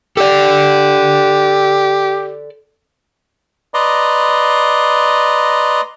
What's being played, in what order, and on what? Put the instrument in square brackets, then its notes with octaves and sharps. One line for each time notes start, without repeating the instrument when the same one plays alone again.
[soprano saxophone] G4 [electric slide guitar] A4 D5
[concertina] B4 D5 D#5 A#5 C6